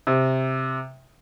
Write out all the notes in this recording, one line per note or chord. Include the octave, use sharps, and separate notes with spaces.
C3